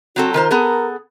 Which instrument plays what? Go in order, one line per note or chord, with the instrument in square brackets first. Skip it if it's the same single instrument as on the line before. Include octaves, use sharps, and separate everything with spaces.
[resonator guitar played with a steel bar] F#3 C4 A4 [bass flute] F#4
[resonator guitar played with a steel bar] D#3 F4 C5 [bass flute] A#4
[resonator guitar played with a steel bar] B3 G#4 A4